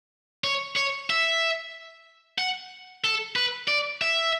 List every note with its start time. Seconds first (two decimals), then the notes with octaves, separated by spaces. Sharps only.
0.44 C#5
0.77 C#5
1.10 E5
2.39 F#5
3.04 A4
3.36 B4
3.68 D5
4.02 E5